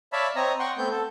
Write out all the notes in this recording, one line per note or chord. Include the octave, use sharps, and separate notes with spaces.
C#5 D5 E5 F5 A5 B5
C4 C#5 D#5 A#5
F#5 G5 C6 C#6
A3 B3 C4 G6
A4